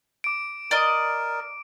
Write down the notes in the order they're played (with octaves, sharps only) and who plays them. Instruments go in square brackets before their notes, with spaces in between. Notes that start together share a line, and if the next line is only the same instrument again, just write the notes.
[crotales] D6 D7
[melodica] A#4 [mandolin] D5 D#5